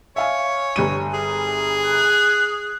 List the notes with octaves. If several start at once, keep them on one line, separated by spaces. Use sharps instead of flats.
C#5 E5 F5 G#5
G1 G3 D#7
G#4
F#6